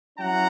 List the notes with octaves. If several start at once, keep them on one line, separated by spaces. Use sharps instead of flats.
F#3 C#4 E4 F#5 A#5